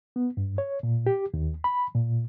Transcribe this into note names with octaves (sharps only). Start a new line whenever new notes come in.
B3
G2
C#5
A#2
G4
D#2
B5
A#2